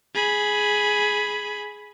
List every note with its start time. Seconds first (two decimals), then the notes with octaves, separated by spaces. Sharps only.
0.15 G#4 B5